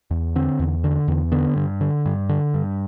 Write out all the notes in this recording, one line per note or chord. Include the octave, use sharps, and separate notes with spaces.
E2
D3 C4
E2
D3
E2
D3 B3
G2
D3
G2
D3
G2